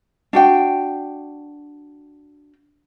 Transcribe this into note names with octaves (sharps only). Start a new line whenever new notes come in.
D4 F#4 G5